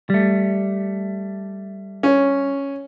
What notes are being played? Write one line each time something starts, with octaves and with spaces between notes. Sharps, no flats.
G3 A3
C#4